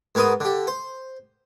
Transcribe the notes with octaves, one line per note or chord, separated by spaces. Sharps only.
G#2 B3 A#4 C6 D#6
D3 G4
C5